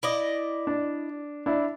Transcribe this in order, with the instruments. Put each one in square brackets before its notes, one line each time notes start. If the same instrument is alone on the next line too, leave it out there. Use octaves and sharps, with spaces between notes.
[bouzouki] E4 D5 D#5
[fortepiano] D4
D4 E4